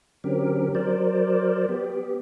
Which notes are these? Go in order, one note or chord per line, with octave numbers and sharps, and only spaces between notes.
D3 F#3 C4 C#4 G4 A#4
F#3 A#4 C5 D5
B3 G4